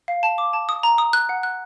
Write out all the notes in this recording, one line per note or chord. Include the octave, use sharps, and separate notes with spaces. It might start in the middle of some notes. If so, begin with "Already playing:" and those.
F5
A5
D6
A5
D#6
A#5
D#6
F#6
F#5
F#6